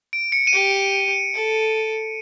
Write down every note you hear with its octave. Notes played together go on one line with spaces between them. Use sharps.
D7
C#7
D#7
G4 D7
A4